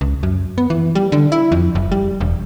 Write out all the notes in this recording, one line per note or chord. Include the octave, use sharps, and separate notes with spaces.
C#2
F#2
B3
E3
G3
D3
E4
F2
F#1
G3
E1